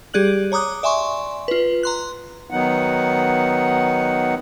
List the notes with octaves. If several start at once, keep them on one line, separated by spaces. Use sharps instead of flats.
G3 G4 G#4 D5 F#6 F#7
C#5 A#5 D6 D#6 F#6
D5 E5 G#5 C6 C#6
F4 B4
A#5 C6 F#6
D#3 F#3 B3 D#4 F#5